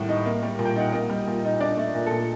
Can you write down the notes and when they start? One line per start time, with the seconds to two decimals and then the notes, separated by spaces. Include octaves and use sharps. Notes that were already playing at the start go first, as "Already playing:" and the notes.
Already playing: A2 D#3 G3 F#5
0.09 D#4
0.26 A#3
0.43 G3
0.59 A#2
0.65 G5
0.76 D#4 F#5
0.92 A#3 D#5
1.09 G3
1.27 A#2
1.44 D#4
1.60 D4 D5
1.77 A3
1.95 A#2
2.06 A#2 A4